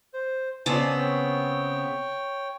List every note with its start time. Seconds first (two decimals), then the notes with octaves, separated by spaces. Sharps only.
0.13 C5
0.66 C#3 B3 C4 D5 G#5 A5
0.98 C#5 G5